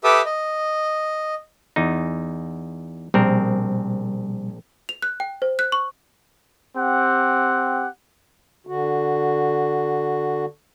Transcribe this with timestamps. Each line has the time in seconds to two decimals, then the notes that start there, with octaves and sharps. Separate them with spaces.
0.04 G4 A4 B4 E5 D6 D#6
0.25 D#5
1.76 E2 D#4
3.14 A#1 B2 G3 C4 A#4
4.89 F7
5.02 F#6
5.20 G5
5.42 C5
5.59 F#6
5.72 C#6
6.76 C4 G4 F#5
8.67 D3 F#4